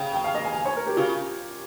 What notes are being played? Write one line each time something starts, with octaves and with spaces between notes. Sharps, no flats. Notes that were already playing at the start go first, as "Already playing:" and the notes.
Already playing: C#3 G5
G5
F5
D#5
G#5
G#5
C#5
A#4
G4
C#3 F4